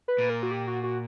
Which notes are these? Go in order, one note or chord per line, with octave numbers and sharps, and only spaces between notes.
B4
A#2
A#4
F#4
G4
F#4
F#4